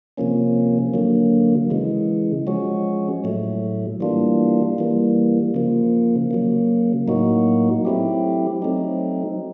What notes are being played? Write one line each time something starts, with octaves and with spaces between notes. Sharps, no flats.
C3 F3 A#3 C#4
D3 F#3 A#3
C#3 E3 G#3
F3 G#3 C#4 F#4
A2 F#3 A3
E3 G3 A#3 D4 F4
E3 G3 A#3
C#3 F3 A#3
C#3 F#3 A#3
A2 F#3 A#3 D#4 F#4
F#3 A3 C4 E4 G4
F#3 A3 C4 D#4